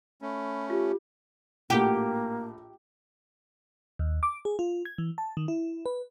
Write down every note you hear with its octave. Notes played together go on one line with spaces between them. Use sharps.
A3 C#4 B5
F4 G4
A#1 A2 A#3 G4 F#5
D#2
D6
G#4
F4
G#6
E3
A5
D#3
E4
B4